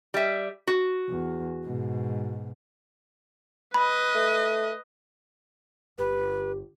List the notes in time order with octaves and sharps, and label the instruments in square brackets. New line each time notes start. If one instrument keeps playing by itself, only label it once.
[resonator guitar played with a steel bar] G3 E5
F#4
[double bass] E2
G#2 B2
[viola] B4 D#5 [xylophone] B5
[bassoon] A3
[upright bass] G1 [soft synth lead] G4 [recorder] B4